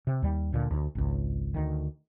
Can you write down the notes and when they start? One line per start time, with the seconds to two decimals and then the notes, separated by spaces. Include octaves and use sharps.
0.07 C3
0.22 D#2 G3
0.52 D2 A#2 D3
0.71 D2
0.95 G#1 C#2
1.54 D2 D#3